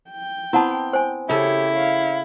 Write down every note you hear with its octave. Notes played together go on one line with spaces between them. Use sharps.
G5
B3 C4 E4 F#5 A5
C5 G#5
C#3 E4 G4 A4 C#5
C#5 F5